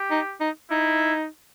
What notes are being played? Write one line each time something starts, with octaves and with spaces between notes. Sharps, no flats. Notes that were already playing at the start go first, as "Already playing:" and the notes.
Already playing: G4
D#4
D#4
D#4 E4